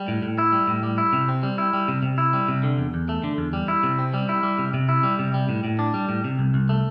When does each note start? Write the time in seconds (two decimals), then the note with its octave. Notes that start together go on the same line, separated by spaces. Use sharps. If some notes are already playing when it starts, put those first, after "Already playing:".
Already playing: G3
0.08 A2
0.22 A2
0.38 E4
0.52 G3
0.67 A2
0.83 G3
0.98 E4
1.13 C3
1.28 C4
1.43 G3
1.58 E4
1.73 G3
1.88 C3
2.03 C3
2.18 E4
2.33 G3
2.48 C3
2.63 D3
2.78 E2
2.94 E2
3.09 A3
3.24 D3
3.38 E2
3.53 G3
3.68 E4
3.83 C3
3.98 C4
4.14 G3
4.29 E4
4.43 G3
4.59 C3
4.74 C3
4.89 E4
5.03 G3
5.19 C3
5.34 G3
5.49 A2
5.64 A2
5.79 D4
5.94 G3
6.09 A2
6.24 C3
6.39 C2
6.54 C2
6.69 A3